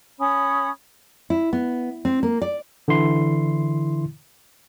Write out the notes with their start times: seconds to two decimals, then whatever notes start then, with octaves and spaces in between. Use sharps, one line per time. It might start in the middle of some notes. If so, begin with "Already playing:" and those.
0.19 C#4 C#5 B5 D#6
1.30 E4
1.53 B3
2.05 C4
2.23 A#3
2.42 D5
2.88 D3 E3 E4 C6